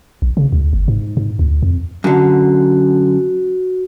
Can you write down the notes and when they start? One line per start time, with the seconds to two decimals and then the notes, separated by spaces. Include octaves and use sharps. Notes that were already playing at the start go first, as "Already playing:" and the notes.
0.22 A#1
0.37 C#3
0.52 D2
0.73 G1
0.88 G#2
1.17 G#2
1.39 D2
1.63 F2
2.04 F#2 D3 F#4